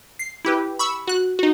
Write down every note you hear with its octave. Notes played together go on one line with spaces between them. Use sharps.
C7
E4 G4 B4
B5 C#6 E6
F#4 F#6
D#4 F#4